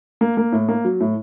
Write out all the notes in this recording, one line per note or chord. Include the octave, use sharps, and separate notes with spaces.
A#3
A#3
A2
A#3
F#3
A2